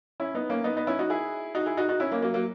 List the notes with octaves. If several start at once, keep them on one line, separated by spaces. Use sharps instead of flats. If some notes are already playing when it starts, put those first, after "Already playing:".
C#4 E4
B3 D#4
A#3 C#4
B3 D#4
B3 D#4
C#4 E4
D#4 F#4
E4 G#4
D#4 F#4
E4 G#4
D#4 F#4
D#4 F#4
C#4 E4
A#3 C#4
F#3 A#3
F#3 A#3